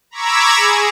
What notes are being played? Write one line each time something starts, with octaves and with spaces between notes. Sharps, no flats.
A#5 B5 C#6 D6 E6 G#6
G#4